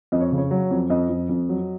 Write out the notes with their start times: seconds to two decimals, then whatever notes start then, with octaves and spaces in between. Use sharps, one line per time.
0.12 F2 D#5
0.20 C#5
0.32 C#3
0.38 C#5
0.51 F#3
0.71 F2
0.90 F2 D#5
1.09 F2
1.29 F2
1.49 F#3